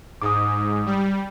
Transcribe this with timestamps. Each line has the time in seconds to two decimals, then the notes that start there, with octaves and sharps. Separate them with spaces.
0.22 G#2 D6 D#6
0.86 G3